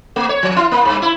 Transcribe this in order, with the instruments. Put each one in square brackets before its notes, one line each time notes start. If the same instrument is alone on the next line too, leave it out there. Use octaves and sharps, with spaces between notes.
[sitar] A3
C#5
F3
E4
A#3
G2
E4